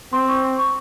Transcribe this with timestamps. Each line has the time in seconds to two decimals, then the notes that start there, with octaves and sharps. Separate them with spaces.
0.13 C4 C6
0.28 C#6
0.44 C6
0.58 C#6